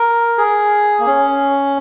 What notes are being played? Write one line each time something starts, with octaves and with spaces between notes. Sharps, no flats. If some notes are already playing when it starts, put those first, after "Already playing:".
Already playing: A#4
G#4
A#3
C#4